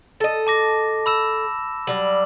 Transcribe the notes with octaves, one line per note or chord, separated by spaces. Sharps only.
A4 D#5
A5 D6 A#6
B5 E6 E7
F#3 G3 F#7